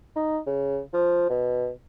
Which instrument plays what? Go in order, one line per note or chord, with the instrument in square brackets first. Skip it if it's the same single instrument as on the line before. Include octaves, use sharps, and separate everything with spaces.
[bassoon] D#4
C#3
F3
B2